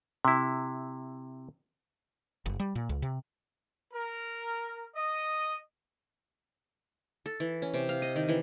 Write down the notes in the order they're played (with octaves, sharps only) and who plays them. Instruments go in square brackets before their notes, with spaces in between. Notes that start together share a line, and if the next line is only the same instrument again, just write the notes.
[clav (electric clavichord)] C3 E4
[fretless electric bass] F#1
G3
A#2
C#2
C3
[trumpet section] A#4
D#5
[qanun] A4
E3
C#4
C3
F5
D#5
D#3
E3